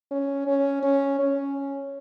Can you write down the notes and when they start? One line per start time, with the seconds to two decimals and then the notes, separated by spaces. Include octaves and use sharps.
0.11 C#4
0.47 C#4
0.83 C#4
1.19 C#4